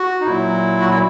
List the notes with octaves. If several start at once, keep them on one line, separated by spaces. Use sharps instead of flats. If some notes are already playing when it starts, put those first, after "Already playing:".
Already playing: F#4
D#4
A#2 F#3 E4
F#4
E4